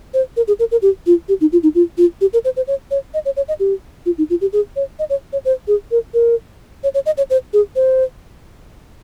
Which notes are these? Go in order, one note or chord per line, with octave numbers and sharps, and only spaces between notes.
C5
A#4
G#4
A#4
A#4
G4
F4
G4
D#4
F4
D#4
F4
F4
G4
A#4
C5
C5
C#5
C#5
D#5
C#5
C#5
D#5
G4
F4
D#4
F4
G4
G#4
C#5
D#5
C#5
C#5
C5
G#4
A#4
A#4
C#5
C#5
D#5
C#5
C5
G#4
C5